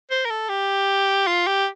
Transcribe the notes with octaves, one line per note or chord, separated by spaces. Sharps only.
C5
A#4
A4
G4
F4
G4